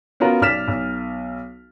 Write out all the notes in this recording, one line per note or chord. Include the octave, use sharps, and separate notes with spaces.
B3 C#4 F4 F#4 A#4
B1 D5 F6 B6 E7
B1